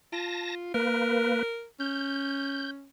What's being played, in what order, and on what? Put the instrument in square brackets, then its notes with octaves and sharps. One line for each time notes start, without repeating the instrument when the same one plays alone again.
[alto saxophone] F4 [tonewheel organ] A5 A#6
[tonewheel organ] A#3 B4 [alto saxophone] A#4
[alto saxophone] C#4 [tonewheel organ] G6